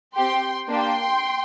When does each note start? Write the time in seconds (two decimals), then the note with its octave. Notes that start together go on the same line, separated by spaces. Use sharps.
0.16 C4 G4 G5 C6
0.68 A#3 D4 G4 G5 C6